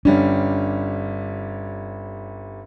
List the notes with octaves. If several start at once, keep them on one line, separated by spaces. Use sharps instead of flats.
G1 G3 C#4 D4